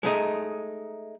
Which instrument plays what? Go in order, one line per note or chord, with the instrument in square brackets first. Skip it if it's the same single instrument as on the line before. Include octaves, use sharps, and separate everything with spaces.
[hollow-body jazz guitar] G#3 A3 D#4